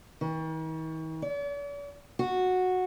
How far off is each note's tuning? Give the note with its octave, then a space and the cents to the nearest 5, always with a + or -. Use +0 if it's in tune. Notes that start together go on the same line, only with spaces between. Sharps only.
D#3 +45
D5 -45
F#4 -10